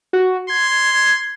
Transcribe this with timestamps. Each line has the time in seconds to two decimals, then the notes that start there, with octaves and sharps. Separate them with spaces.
0.13 F#4
0.50 C6 G#6